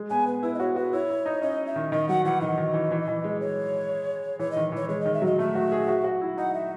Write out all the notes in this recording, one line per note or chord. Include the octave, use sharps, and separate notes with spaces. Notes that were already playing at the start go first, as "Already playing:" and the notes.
Already playing: G#3
B3 G#5
B4
E4 B4
D#5
F#4 C#5
F#4 B4
E4 C#5
E4
D#4
C#4 D#5
E5
D#3
D#3 D#5
F#3 F#5
E3 F#5
D#3 D#5
D#3
E3
E3
E3
G#3
C#5
E3 C#5
D#5
D#3
E3 C#5
G#3 C#5
D#3 D#5
E5
F#3 D#5
A3 E5
F#4
G#4
F#4
F#4
E4
D#4 F#5
E5